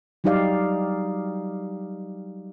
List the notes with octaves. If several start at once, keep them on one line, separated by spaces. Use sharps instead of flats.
F#3 G3 D#4 G4 D5 F5